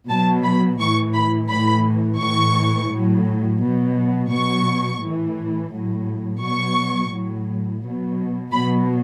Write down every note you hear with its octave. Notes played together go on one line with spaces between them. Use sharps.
B2 F#3 A5
B5
A2 E3 C#6
B5
A2 E3 B5
A2 E3 C#6
A2 F#3
B2 F#3
B2 F#3 C#6
A2 E3
A2 F#3
B2 F#3 C#6
A2 F#3
B2 F#3
B2 F#3 B5